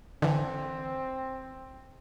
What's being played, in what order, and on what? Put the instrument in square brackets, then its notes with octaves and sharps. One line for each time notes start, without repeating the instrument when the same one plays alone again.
[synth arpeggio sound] D3 E3 [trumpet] C4